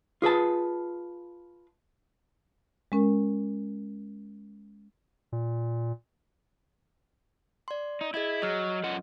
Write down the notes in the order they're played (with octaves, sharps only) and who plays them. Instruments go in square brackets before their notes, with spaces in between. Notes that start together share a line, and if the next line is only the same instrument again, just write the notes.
[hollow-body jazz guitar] F4 G#4 B4 A5
[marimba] G#3 C#4 A#4
[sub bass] A#2
[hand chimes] D5 C6
[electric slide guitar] D#4
[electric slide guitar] E4 [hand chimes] G#4 D#5 G#6
[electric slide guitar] F#3 [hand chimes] D#5 F6
[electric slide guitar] F#2 F4 F#5